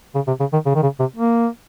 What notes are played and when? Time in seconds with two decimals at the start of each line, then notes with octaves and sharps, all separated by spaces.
0.15 C#3
0.27 C3
0.40 C#3
0.53 D#3
0.66 C#3
0.75 D#3
0.83 C#3
0.99 C3
1.16 A#3